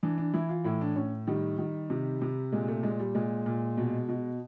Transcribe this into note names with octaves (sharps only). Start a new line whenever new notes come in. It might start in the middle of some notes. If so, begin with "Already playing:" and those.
E3 D4
D4
E3 E4
F4
A2 E4
D4
A2 C#4
D#3 G3
D#3
C3
C3
A#2 G#3
A3
A#2 G#3
G3
A#2 G#3
A#2
B2
B2